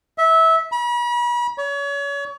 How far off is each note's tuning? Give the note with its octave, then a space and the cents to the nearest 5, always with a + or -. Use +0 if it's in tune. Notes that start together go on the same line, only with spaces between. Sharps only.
E5 -20
B5 -40
C#5 +35